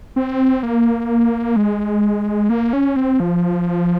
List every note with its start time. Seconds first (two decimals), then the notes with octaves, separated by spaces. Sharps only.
0.16 C4
0.63 A#3
1.56 G#3
2.50 A#3
2.73 C#4
2.96 C4
3.20 F3